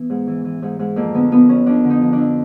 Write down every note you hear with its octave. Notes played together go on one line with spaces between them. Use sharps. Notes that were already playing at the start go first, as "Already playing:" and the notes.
Already playing: E3 B3
G#2
E3
E3
G#2
G#2
F2 A#3
D3 B3
F3 B3
F2 C#4
F2 D4
D3
D#4
F3
D4
F2